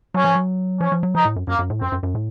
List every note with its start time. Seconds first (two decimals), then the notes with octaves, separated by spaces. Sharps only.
0.14 F#3 C#4
0.24 F3
0.35 F#3
0.80 F3 C#4
0.92 F3
1.03 F#3
1.14 F3 D#4
1.25 A2
1.36 F#2
1.47 F#2 A#3
1.59 F#2
1.70 A2
1.80 F#2 C4
1.92 F#2
2.03 F#2
2.15 A2